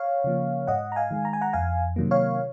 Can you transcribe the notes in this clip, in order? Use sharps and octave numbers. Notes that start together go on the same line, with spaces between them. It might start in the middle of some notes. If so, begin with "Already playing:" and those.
Already playing: C#5 F5
C#3 F3 A#3
G#2 D#5 F#5
A#5
F5 G#5
D#3 G#3
A#5
G#5
F#5 A#5
F2 F5 G#5
C3 D#3 F#3 A#3
C#5 F5